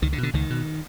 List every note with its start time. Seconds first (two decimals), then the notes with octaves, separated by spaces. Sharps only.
0.02 C#2 D#3
0.12 D3
0.18 B2
0.23 D3
0.33 C#2 D#3
0.50 B2